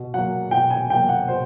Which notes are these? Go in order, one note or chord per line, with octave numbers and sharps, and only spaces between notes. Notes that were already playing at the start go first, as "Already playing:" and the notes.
Already playing: B2
F#3 A#3 F#5
B2 G5
G#5
F#3 A#3 G5
F#5
B2 C5